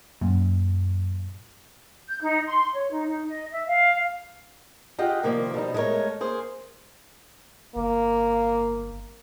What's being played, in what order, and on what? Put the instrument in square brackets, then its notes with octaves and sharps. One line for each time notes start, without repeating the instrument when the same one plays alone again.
[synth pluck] F#2 A#2
[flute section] G6
D#4
C6
C#5
D#4
D#4
D#5
E5
F5
[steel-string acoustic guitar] F4 G4 G#4 D#5 F#5 G5
C3 D#3 F3 G3 A#3
B2 F3 G3 D#4
G#3 A3 D4 G4 A#4 C#5
A#3 G#4 C5
[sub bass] G1 [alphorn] A#3